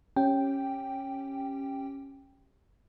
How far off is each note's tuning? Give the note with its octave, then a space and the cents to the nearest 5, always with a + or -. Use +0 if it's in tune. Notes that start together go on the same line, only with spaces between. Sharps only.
C#4 -15 G4 +0 G5 +0